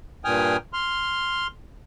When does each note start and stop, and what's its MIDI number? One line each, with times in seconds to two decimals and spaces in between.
0.25 0.57 43
0.25 0.57 46
0.25 0.57 79
0.25 0.57 80
0.25 0.57 87
0.25 0.57 89
0.73 1.47 84
0.73 1.47 89